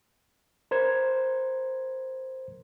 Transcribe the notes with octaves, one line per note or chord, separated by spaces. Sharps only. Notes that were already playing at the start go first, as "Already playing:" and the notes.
A#4 C5 G#6